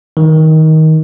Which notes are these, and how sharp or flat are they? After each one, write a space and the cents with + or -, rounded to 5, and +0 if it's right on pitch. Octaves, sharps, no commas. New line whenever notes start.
D#3 +20